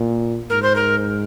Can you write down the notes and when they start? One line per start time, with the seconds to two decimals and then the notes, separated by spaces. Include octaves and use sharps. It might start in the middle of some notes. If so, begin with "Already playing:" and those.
Already playing: A#2
0.50 G#2 A#4
0.62 C5
0.76 A#4